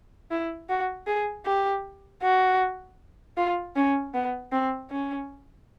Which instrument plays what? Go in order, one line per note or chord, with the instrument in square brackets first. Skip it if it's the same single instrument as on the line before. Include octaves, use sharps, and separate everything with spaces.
[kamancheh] E4
F#4
G#4
G4
F#4
F4
C#4
B3
C4
C#4